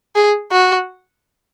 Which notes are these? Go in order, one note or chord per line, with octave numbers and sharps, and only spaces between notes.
G#4
F#4